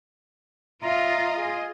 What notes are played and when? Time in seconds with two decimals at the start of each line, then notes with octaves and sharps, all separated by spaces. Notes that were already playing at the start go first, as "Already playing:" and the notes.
0.82 F4 D#5 E5 A#5
1.38 G#4